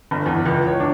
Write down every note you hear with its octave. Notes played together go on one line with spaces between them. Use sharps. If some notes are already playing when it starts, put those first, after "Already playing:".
G1
E2
C#2
C#5
D4